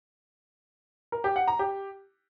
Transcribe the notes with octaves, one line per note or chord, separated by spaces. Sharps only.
A#4
G4
F#5
A#5
G4